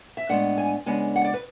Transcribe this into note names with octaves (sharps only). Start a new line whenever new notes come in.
E5
A2 G#3 B3 D4 F#5
G#5
C#3 G#3 B3 D4 G#5
F#5
D5
B4